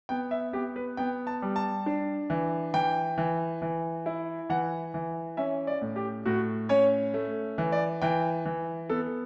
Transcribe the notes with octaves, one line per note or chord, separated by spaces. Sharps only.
B3 G5
E5
B3 G4
B4
B3 G5
A5
G3
A5
D4
E3
E3 G5
E3
E3
E4
E3 F#5
E3
C#4 E5
D5
A2
G4
A2 F#4
C#4 C#5
A3
E3
D5
E3 G5
E3
B3 A4